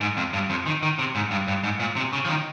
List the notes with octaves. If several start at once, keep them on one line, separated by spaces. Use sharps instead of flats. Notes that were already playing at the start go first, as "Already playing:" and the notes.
G#2
F2
G2
F2
D#3
D#3
C3
G#2
G2
G2
G#2
A#2
C3
C#3
F3
D#3